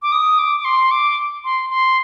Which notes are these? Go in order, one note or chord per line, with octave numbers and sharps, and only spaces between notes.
D6
D#6
D6
D6
C6
D6
C6
C6